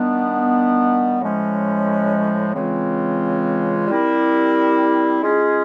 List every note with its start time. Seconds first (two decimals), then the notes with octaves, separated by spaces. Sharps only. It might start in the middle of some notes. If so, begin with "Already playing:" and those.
Already playing: D#3 G3 B3 D4
1.21 A2 F3 G#3 C#4
2.54 C#3 E3 G#3 C4 F4
3.88 G3 C4 E4 G4 A#4
5.22 G#3 C#4 F4 G#4